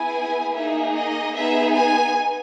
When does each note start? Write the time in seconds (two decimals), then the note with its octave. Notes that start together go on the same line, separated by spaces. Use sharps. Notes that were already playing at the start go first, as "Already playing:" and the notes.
Already playing: B3 E4 G#4 G#5
0.54 A#3 D#4 G#4 E5
0.95 D#5
1.35 B3 D#4 G#4 E5
1.76 G#5